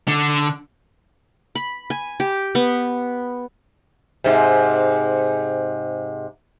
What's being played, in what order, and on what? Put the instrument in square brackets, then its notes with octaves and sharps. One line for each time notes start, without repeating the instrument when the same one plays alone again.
[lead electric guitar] D3
[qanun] B5
G#5
G4
B3
[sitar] G#2 C3